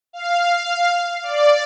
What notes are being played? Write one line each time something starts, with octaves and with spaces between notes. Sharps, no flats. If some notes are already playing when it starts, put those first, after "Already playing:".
F5
D5